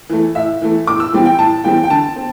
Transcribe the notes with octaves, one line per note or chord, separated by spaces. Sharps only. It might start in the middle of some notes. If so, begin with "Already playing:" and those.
E3 A3
A2 E5
E3 A3
A2 D6
E6
E3 G3 C4
G5
A2 A5
E3 G3 C4 G5
G5
D3 A5
C4